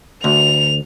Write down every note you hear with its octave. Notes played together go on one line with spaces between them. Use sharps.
D2 F7